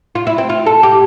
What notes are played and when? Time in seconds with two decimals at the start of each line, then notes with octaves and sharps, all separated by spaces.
0.15 F4
0.27 E4
0.38 C4
0.50 F4
0.66 A4
0.83 G4